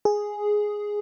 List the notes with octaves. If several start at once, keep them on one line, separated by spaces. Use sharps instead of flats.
G#4